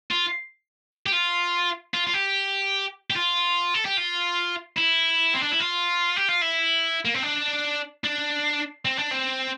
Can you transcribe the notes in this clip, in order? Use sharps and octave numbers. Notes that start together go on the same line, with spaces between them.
F4
G4
F4
F4
F4
G4
G4
F4
A4
G4
F4
E4
C4
D4
E4
F4
G4
F4
E4
A#3
C4
D4
D4
C4
D4
C4